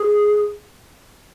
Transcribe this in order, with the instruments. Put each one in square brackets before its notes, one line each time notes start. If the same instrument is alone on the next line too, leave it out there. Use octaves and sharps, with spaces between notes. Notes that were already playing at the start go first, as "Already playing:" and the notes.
Already playing: [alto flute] G#4